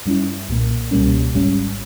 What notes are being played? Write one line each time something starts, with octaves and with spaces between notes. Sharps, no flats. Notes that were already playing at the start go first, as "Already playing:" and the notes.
G2 G3 C#4 E4
B1 A#2 A#3
C#2 B2 G3 A#3 C#4
G#1 G#2 G3 C#4